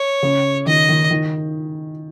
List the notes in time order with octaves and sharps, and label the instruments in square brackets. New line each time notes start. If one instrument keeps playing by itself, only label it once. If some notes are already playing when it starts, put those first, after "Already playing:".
Already playing: [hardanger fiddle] C#5
[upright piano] C#3
[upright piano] D#3 [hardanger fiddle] D#5
[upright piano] D#3
D#3